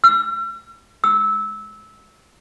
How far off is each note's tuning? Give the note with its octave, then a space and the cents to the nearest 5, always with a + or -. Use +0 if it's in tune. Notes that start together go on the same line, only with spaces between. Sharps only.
E6 +45
E6 -15